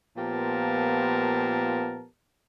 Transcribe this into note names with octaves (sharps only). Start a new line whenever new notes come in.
A#2 F3 B3 G4 A#4 A5